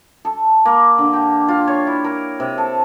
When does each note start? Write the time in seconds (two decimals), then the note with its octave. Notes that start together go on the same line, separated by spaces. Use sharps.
0.25 A4
0.65 A#3
0.98 D3
1.13 G4
1.48 F4
1.67 C#5
1.87 E4
2.04 A#4
2.40 C3
2.58 A4